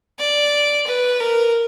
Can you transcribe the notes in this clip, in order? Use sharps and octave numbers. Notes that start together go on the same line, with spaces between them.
D5
B4
A#4